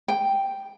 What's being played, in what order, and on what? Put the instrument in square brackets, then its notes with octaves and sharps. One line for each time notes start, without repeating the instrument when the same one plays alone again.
[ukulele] G5